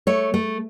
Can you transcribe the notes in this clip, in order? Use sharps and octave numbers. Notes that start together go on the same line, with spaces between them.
A3 C#5
A3